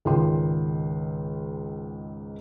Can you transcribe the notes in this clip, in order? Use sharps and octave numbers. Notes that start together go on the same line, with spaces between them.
C#2 G#2 D#3 G5 C6